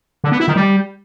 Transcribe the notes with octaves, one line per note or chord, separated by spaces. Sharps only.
D3
B3
E4
D#3
G3